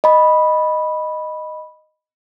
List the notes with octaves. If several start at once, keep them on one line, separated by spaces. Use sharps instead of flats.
D#5 B5